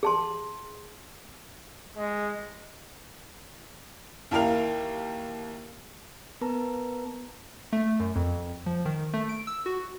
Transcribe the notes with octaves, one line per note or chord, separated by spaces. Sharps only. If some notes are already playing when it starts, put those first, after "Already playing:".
G#4 A5 C6
G#3
D#2 E4 G4 A#4 F5 F7
B3 A#4 B4 A5 A#5
A3
F#2
F2
F3
D#3
A3
D7
E6
F#4